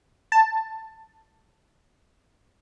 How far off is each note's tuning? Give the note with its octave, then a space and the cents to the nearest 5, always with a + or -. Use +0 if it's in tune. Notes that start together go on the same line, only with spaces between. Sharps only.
A5 +10